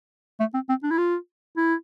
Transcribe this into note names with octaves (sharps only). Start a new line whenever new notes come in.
A3
C4
C4
D4
E4
F4
E4